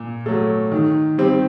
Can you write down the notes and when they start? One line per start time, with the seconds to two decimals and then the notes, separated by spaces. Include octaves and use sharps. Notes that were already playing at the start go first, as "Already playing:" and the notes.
Already playing: A#2
0.26 F#3 A3
0.71 D#3
1.18 G3 C4 G4